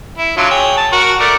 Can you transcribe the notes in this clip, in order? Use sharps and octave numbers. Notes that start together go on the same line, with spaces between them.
E4
D3 F#3 F4
G#4 C#5 G5
A5
F#4 A#4
A3 A#4 D5